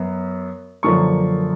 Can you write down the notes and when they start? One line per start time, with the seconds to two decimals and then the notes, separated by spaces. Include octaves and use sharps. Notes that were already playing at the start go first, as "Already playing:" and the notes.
Already playing: F#2 B3
0.83 F#2 D3 F3 A#3 C#6